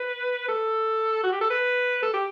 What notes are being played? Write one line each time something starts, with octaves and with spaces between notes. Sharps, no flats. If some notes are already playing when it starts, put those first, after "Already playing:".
Already playing: B4
A4
F#4
G4
A4
B4
A4
G4